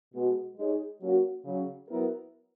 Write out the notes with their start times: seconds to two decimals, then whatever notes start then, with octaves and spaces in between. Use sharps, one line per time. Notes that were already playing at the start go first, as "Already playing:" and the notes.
0.14 B2 G#3 B3 F#4
0.57 G#3 D#4 G#4 C#5
1.01 F#3 A#3 C#4 F#4
1.45 C#3 F#3 C#4
1.89 F#3 B3 E4 A#4